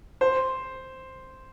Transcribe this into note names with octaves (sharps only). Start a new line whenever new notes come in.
C5